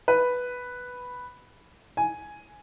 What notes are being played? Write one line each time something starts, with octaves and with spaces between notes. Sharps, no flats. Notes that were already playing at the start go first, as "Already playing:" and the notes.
B4
G#5